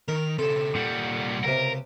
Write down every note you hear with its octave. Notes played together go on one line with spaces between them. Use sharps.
D#3 A#4
C#3 C4 A4
C2 A#2 G3 F#5
C#2 C3 A#4